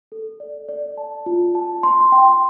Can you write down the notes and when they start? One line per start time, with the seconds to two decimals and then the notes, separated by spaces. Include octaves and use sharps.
0.12 A4
0.40 D5
0.69 D5
0.97 A5
1.26 F4
1.55 A5
1.83 C6
2.12 G5